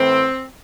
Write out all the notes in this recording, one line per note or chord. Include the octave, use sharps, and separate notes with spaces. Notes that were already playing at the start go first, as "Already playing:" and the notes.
Already playing: A2 E3 C4